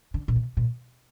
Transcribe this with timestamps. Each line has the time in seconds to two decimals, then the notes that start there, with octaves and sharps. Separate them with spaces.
0.14 D3
0.28 A#2
0.36 C3
0.57 A#2